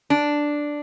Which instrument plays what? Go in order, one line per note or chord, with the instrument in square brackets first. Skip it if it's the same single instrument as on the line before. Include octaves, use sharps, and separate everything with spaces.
[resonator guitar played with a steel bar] D4